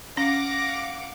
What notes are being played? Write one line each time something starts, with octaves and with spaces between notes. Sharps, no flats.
C#4 F5 F#5 D6 A#6